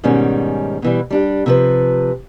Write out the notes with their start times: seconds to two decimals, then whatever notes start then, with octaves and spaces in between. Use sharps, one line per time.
0.04 G#2 B2 D#3 G3 C#4
0.82 B2 E3 G3
1.10 G3 D4 G4
1.46 C3 F3 B4